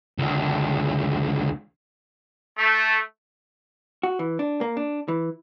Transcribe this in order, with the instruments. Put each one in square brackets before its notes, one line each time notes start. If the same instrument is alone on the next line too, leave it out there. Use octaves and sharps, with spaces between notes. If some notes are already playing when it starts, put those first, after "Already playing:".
[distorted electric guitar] C#2 D3
[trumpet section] A3
[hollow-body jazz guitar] F#4
E3
D4
A#3
D4
E3